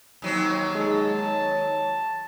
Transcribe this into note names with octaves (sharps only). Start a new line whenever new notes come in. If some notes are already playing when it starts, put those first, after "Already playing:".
D#2 F#3 C4
G#3 A5
C#5